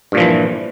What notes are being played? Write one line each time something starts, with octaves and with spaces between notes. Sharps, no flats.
G2 A#2 E3 F3